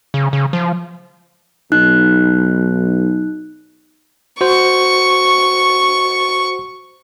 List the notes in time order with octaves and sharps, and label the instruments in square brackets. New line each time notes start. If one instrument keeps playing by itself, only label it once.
[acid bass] C#3
C#3
F3
[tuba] B1 [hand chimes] D#4 F#6
[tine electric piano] F#4 C5 [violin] C#6